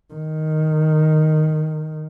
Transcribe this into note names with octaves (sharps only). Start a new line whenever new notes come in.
D#3